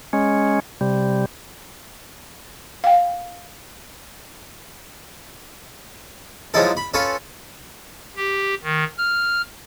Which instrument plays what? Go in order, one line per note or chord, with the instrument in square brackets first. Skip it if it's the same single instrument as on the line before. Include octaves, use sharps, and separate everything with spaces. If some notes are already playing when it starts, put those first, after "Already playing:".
[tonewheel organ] G#3 C#4
C3 G3
[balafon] F5 G5
[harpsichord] F3 F#3 G#3 D#4 E4 A4
B5
C#4 F4 A4 B4 C#5
[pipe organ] G4
D#3
F6